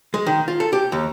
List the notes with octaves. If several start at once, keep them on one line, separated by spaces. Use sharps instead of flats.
G#3
D#3
F4
A4
G4
D#2